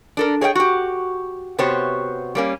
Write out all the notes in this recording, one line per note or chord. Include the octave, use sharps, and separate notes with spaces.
D4 A4 A#4
G#4 C#5 D#5 E5 G5
F#4 G4
C3 B3 F#4 G4 C5 C#5
G3 A#3 C#4